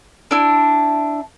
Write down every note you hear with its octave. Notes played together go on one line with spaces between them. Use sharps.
D4 E4